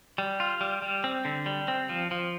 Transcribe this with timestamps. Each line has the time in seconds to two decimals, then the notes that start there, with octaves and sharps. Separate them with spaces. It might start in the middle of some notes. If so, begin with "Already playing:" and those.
0.18 G3
0.40 F4
0.61 G3
0.82 G3
1.04 C4
1.25 D3
1.46 G3
1.68 C4
1.89 F3
2.11 F3